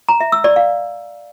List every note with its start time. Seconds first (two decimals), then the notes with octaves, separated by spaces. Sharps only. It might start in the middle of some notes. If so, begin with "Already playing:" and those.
0.09 A#5
0.20 E5
0.32 E6
0.44 D5
0.56 F5